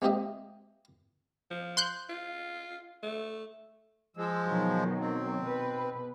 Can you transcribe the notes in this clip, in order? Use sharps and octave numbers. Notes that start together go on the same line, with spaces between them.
G#3 A#3 C4 G4 D#5 E5
F3
C6 F#6 G6
F4
A3
F3 G#3 E6
B2 D#3 F#3
C4
B2 B4